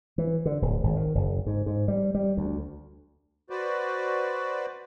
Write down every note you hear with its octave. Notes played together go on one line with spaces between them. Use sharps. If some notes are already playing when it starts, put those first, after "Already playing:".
E3
D3
D1
G#1
D#3
F#1
G#2
G#2
G3
G3
D2
F#4 B4 C5 D5